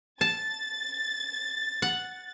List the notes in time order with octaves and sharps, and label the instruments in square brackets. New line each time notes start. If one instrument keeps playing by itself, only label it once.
[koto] A5 [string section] A6
[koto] F#5